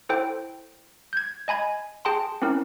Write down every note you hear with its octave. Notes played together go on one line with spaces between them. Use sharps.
E4 A4 C5 G5
G6 G#6
D#5 G#5 B5 G#6
G#4 G5 A5 C6
C4 C#4 E4 A#4